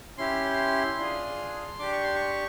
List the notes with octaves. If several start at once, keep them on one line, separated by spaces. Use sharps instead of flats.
C#4 E4 G4 C6
D4 F4 G#4
D4 G4 D6
C#6
C6
C#6